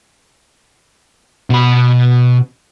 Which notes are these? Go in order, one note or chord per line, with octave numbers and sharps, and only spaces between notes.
B2 B5